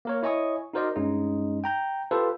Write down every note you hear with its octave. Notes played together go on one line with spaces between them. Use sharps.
A#3 A#4 C#5
E4 C#5 D#5 G#5 C#6 D#6
D#4 F#4 A#4 C5 D5 D#5
G2 G#3 C#4 D#4
G5 A#5 G6
F4 G4 A4 B4 C5